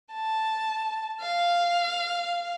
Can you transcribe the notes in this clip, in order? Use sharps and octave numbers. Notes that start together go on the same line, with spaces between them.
A5
F5